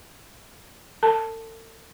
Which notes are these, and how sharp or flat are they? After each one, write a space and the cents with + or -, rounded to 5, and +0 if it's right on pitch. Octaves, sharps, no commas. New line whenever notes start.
A4 +40 A5 +0